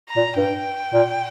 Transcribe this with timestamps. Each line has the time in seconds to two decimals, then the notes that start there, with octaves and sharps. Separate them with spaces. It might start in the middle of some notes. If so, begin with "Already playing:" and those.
0.09 A#5
0.16 A#2
0.37 G2 G5
0.93 A#2